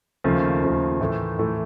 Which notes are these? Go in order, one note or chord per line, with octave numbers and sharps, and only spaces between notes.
D#2 C#3 F3 A3
D#2 C#3 F3 A3
A2 E3 A3
A2 E3 A3